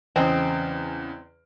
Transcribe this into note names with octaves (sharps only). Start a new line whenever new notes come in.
E2 C#3 G#3 C4